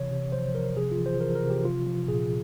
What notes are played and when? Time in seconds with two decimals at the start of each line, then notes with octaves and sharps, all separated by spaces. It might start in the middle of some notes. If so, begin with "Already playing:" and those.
Already playing: C3 E3 C#5
0.10 C3
0.32 F3 C5
0.55 F3 A#4
0.76 C3 G#4
0.91 F4
0.99 E3
1.06 C5
1.21 E3 A#4
1.35 A#4
1.43 C3
1.50 G4
1.64 F3 F4
1.87 F3
2.08 A#2 G#4